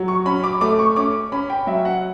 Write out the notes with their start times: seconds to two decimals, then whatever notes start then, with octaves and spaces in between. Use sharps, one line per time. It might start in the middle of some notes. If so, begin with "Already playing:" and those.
Already playing: F#3
0.08 C#6
0.26 C#4 B5
0.44 D6
0.61 A3 D6
0.79 C#6
0.96 C#4 D6
1.32 C#4 B5
1.50 G5
1.67 F#3 E5
1.85 F#5